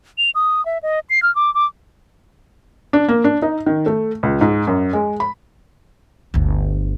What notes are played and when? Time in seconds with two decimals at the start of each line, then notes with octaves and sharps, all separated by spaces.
0.18 F7
0.35 D#6
0.66 E5
0.83 D#5
1.10 C7
1.23 F6
1.35 D6
1.55 D6
2.93 D4
3.08 A#3
3.24 D4
3.42 D#4
3.66 D#3
3.86 A3
4.23 C#2
4.41 G#2
4.67 F#2
4.93 G#3
5.20 B5
6.34 G1 D2